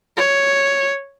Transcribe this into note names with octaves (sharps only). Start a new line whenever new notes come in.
C#5